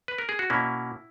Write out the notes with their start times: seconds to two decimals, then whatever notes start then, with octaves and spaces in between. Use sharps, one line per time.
0.08 B4
0.18 A#4
0.29 G#4
0.39 F#4
0.50 B2 A#3 C#4 E4